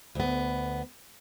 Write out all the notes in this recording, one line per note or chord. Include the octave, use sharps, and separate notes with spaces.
D2 B3